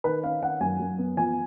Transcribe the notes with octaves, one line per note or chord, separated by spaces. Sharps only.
D#3 B4
C#4 F5
D#3 F#5
F#2 G#5
F#2
B3
F3 G#5